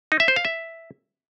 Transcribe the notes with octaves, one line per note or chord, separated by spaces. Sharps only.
D#4
E5
C5
F5
E5